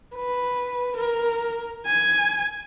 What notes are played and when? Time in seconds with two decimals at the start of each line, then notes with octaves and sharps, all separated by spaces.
0.16 B4
0.97 A#4
1.86 G#5